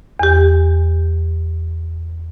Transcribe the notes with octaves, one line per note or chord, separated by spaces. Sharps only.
E2 G4